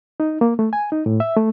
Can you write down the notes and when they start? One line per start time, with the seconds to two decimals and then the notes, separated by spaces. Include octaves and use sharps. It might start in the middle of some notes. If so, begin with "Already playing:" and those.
0.20 D#4
0.41 A#3
0.59 A3
0.73 G#5
0.92 D#4
1.06 A2
1.20 E5
1.36 A3